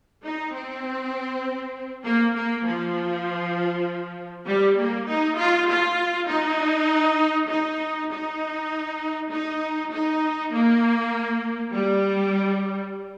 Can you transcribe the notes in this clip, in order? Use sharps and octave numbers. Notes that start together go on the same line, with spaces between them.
D#4
C4
A#3
A#3
F3
G3
A#3
D#4
F4
F4
D#4
D#4
D#4
D#4
D#4
A#3
G3